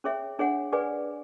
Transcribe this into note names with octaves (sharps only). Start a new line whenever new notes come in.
C#4 G#4 C#5 E5
D4 G#4 C#5 F#5
G#4 B4 D5 G#5